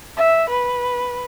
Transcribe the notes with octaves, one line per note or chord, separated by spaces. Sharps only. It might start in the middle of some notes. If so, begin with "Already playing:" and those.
E5
B4